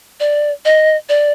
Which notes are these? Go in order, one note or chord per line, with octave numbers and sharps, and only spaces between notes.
D5
D#5
D5